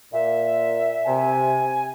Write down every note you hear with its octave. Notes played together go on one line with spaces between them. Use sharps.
A#2 E5
C3 G#5